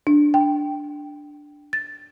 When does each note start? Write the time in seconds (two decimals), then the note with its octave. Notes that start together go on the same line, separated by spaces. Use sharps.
0.07 D4
0.34 G5
1.73 A6